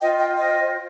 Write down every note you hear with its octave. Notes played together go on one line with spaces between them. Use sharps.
F4 C5 D#5 G5
D#5 G5
D#5 G5